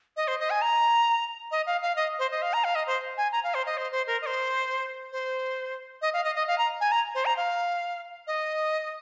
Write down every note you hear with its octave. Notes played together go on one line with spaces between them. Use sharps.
D#5
C5
D#5
G#5
A#5
D#5
F5
F5
D#5
C5
D#5
F5
A#5
F5
D#5
C5
G#5
A#5
F5
C5
D#5
C5
C5
A#4
D#5
C5
C5
D#5
F5
D#5
D#5
F5
A#5
G#5
A#5
C5
A#5
F5
D#5